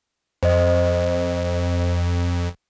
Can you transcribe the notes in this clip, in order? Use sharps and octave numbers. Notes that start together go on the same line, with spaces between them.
F2 C5 D#5